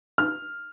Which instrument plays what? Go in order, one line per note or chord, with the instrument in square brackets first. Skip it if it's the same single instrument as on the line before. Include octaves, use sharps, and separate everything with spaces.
[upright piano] F6